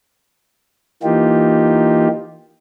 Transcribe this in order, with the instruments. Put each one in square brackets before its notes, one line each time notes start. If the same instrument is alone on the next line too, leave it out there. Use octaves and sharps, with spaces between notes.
[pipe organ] E3 A#3 D#4 F4 G4